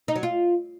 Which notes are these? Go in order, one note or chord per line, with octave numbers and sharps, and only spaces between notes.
D#4
F#3
F4